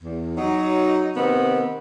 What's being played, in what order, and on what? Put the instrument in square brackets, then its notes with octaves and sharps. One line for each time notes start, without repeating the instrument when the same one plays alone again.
[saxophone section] E2
F#3 D#4
C3 D#3 B3 C4